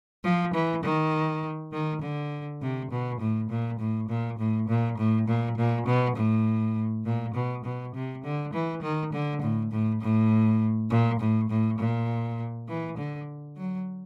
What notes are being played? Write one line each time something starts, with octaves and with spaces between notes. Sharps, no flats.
F3
E3
D#3
D#3
D3
C3
B2
A2
A#2
A2
A#2
A2
A#2
A2
A#2
A#2
B2
A2
A#2
B2
B2
C3
D3
E3
D#3
D3
A2
A2
A2
A#2
A2
A2
A#2
E3
D3
F#3